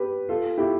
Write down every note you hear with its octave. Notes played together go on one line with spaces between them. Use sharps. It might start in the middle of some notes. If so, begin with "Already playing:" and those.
Already playing: G4 B4
F4 A4
E4 G4